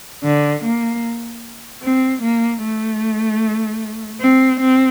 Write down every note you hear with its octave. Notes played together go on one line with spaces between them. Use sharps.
D3
A#3
C4
A#3
A3
C4
C4